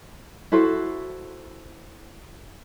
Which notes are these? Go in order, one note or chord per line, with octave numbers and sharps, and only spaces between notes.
E4 F#4 A4 C5